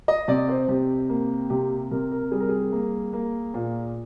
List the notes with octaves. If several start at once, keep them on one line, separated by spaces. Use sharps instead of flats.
D#5
C3 D5
C5
C3 G4
A#3
C3 G4
C3 A#4
A#4
G3 G#4
A#4
G#4
A#3
A#3
A#2